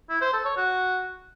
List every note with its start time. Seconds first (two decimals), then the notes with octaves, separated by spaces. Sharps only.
0.10 E4
0.22 C5
0.33 A4
0.45 C#5
0.57 F#4